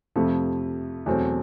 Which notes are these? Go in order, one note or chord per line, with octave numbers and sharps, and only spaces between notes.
F2 C3 F3 A3
E2 B2 F#3 A3 C4